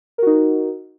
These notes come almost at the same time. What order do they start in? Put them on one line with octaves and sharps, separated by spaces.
A#4 F#4 D#4